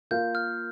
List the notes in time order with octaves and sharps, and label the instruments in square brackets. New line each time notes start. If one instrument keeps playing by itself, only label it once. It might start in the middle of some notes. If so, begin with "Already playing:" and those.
[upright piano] A#3 F4 A#4 F5 [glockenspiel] G6
[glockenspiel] F6